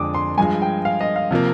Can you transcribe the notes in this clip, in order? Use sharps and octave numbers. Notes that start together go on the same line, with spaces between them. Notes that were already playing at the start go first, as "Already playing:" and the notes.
Already playing: F2 D3 G#3 D4 D6 D#6
C6
G2 F3 G#3 G#5
G5
F5
D#5
F5
C3 F3 A#3 F5